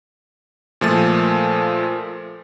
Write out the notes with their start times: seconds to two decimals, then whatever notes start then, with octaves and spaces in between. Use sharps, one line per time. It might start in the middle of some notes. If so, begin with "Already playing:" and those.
0.81 A#2 F3 A3 A6